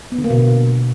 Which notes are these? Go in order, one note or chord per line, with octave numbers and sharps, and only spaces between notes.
B3
D3
A#3
B2